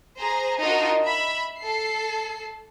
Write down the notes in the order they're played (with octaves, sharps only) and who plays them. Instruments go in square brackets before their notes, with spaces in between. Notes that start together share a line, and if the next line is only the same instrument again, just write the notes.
[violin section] G#4 C5 A#5
D4 D#4 F4 F#4 A#4 D#5
E5 B5
A4 C7